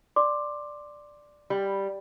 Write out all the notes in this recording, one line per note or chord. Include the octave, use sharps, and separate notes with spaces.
D5 C6 D6
G3